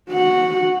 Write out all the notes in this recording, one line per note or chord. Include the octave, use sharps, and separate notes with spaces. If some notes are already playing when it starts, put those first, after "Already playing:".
F#4 F#5